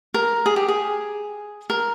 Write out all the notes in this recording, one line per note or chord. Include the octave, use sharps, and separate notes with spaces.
A#4
G#4
G4
G#4
A#4